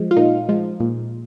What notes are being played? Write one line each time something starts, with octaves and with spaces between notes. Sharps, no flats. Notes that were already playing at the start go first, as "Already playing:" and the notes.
Already playing: F3 G#3
F4
A#2 D#4
F3 G#3
A#2